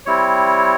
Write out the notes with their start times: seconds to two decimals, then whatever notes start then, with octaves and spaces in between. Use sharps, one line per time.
0.06 G3 C4 E4 C#5